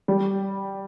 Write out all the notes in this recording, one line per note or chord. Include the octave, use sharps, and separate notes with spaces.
G3